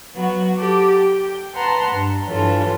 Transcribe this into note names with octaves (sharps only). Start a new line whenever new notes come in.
F#3 B3 F#4
G4 A4 D6
G5
B4 F#5 A5 A#5 C6
G2
G2 E3 F4 A4 C#5